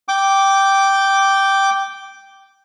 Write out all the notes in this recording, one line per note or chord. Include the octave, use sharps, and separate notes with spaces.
G5 D6